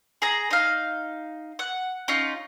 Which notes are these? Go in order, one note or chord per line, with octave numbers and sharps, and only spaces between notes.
G#4 A#5
D#4 F5
F#5
C#4 D#4 F4